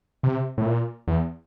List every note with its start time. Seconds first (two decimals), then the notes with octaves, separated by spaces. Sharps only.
0.23 C3
0.58 A2
0.66 A#2
1.08 E2